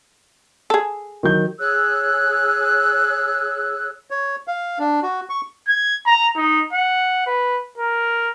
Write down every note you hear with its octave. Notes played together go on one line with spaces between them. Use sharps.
G#4 A4
D#3 F#3 G6
G#4 C#5 E6 F#6
C#5
F5
D4
F#4
C#6
G#6
A#5
D#4
F#5
B4
A#4